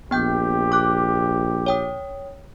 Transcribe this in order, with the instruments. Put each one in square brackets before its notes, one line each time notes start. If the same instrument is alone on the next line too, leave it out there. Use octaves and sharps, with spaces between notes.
[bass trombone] A#1 [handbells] B3 G5 G6 [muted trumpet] G4
[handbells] D6 F#6
C#5 G5 D#6